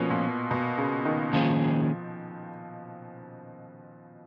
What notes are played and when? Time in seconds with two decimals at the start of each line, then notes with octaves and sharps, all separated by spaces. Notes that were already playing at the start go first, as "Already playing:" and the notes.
Already playing: B2 F3 A#3 C#4
0.10 A#2
0.51 B2
0.78 C#3
1.05 D#3
1.33 D#3 F3 A#3 C#4 G#4